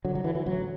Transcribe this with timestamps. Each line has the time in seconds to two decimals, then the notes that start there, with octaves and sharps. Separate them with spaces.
0.05 D3 F#3
0.15 F#3
0.24 D3 E3
0.35 E3
0.46 A1 F#3